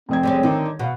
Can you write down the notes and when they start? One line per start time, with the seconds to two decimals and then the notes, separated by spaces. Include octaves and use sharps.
0.09 F1 C4 D#5 G#6
0.23 G3 G#3 C#4
0.43 D3 D#3 D#4
0.79 B2 F#4 F5